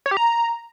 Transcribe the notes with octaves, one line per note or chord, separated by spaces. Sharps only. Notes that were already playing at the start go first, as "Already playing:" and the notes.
C#5
G4
A#5